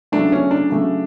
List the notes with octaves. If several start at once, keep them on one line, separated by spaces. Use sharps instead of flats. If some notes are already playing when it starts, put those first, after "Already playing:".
C#3 F#3 A3 D4
C#4
D4
C#3 F#3 A3